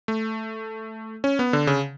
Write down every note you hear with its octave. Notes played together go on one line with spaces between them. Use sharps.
A3
C#4
B3
D3
C#3